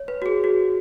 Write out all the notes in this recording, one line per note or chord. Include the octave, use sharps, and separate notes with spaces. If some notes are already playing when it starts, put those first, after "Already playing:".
Already playing: C#5
B4
F#4
G#4
F#4